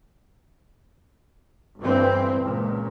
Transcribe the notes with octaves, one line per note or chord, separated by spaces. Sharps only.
G1 G2 E3 C4
C#2 A#2